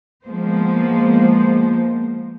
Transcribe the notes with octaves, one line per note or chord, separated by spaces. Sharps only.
F3 G#3 A#3 B3 C5